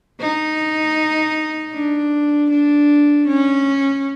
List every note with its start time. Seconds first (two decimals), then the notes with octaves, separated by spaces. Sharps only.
0.21 D#4
1.73 D4
2.50 D4
3.27 C#4